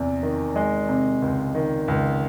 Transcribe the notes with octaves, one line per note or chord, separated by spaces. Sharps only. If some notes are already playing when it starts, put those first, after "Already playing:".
Already playing: E2 C3
D#3
G#3
C3
C#2
D#3
C#2